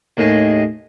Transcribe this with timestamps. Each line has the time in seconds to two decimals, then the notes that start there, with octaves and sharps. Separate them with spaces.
0.17 D#2 A2 D#4 G#4 D#5